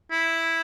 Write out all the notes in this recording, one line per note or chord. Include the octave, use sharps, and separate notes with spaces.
E4